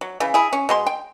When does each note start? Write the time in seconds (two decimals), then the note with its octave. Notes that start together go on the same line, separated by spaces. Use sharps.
0.01 F#3
0.20 C#3 E3
0.34 E4 G#4
0.53 C#4
0.69 B2 G#3 C6
0.86 G5